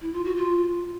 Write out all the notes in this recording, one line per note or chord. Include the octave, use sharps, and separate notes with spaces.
E4
F4
F#4
F4